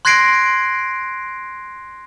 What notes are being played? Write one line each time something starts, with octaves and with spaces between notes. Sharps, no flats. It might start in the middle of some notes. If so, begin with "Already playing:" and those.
C6 F#6 G#6 A#6 C7 D7